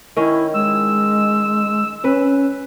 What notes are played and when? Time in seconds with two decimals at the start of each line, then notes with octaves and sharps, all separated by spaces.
0.17 D#3 C#4 E4
0.54 G#3 E6
2.04 C#4 B4